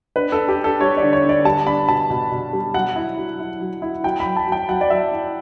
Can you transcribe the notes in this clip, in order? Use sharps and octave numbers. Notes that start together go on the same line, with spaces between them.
D4 B4
D4 A4
G4
D4
A4
G3 C#5
D5
D3
C#5
D3
D5
G3 A5
D4 B5
B2 A5
B2
B2
G3
F#3 F#5
E4
F#3
E4
F#3
E4
F#3 G5
B5
F#3
A5
F#3
G5
F#3 F#5
D5
F#3 E5
E4